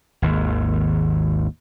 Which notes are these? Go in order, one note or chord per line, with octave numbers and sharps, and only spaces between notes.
G#1 D#2